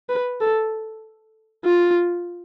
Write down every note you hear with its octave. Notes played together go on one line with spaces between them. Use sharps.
B4
A4
F4